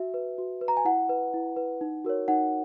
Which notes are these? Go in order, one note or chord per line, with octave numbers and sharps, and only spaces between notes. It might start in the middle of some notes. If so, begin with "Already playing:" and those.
Already playing: F#4 E5
B4
F#4
B4
A#5
G#5
E4 F#5
B4
E4
B4
D#4
F#4 A#4 C#5
D#4 F#5